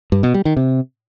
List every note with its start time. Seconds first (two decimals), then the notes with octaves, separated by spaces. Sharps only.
0.12 G2
0.23 B2
0.34 G3
0.45 D#3
0.57 C3